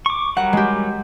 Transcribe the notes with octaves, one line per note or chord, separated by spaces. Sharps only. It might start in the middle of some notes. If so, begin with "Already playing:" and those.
C#6 D6
F#3 G3 A#4 F#5
G#3 G4